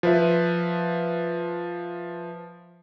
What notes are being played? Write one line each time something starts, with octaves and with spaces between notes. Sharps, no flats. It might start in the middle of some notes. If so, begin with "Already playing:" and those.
F3 B4 E5